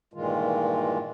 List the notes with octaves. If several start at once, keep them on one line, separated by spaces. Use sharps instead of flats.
G2 A#2 D#3 E3 G#3 F4